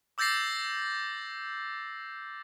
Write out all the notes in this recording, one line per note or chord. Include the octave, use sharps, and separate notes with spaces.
D6 E6 G6 A6 A#6 C7